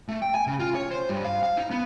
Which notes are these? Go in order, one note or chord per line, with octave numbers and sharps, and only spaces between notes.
A3
G5
G#5
C#3
F4
C#5
C5
G2
F5
F5
D#4
B3